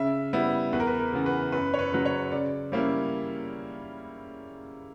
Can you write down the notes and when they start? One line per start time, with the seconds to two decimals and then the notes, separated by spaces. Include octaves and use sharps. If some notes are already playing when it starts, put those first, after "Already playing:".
Already playing: C#3 E5
0.33 G3 B3 E4
0.73 E2 B4
0.80 A#4
0.87 B4
1.00 A#4
1.13 C#3 E3 B3
1.26 B4
1.52 F#2 B4
1.74 C#5
1.79 B4
1.92 C#3 F#3 B4
2.06 C#5
2.32 C#3 D5
2.72 G3 A#3 C#4 E4